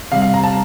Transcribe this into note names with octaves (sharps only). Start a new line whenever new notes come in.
C3 G3 F5
F5
A#5
A5